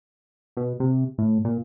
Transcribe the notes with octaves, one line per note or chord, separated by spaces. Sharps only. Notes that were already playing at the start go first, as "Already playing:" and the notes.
B2
C3
A2
A#2